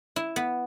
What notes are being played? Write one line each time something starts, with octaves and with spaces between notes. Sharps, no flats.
E4
B3